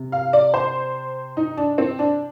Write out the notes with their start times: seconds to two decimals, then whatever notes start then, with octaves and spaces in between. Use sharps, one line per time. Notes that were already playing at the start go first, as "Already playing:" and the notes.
Already playing: C3
0.12 F5
0.33 D5
0.54 C5
1.37 D#4
1.57 D4
1.78 C4
1.99 D4